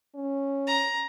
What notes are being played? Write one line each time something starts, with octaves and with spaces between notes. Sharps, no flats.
C#4
A#5